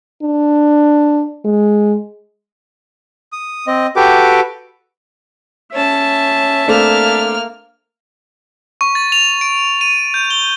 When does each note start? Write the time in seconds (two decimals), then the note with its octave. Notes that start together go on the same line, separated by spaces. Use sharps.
0.23 D4
1.45 G#3
3.32 D#6
3.67 C4 D#5
3.96 F#4 G4 A4 B4 G5 D6
5.73 C#4 E5 A5
6.68 A3 A#3 C4 D4 F6
8.81 C#6
8.95 A6
9.12 F7
9.41 D7
9.81 D#7
10.14 G6
10.30 G7